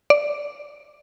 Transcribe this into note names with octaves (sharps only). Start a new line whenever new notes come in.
D5